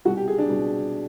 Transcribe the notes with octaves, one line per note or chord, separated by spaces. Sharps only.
C2 B2 F#4
G4
G#4
D4
C2 B2